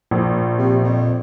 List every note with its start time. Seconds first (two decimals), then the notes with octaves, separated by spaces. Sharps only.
0.11 A#1 A#2
0.59 C3
0.84 F2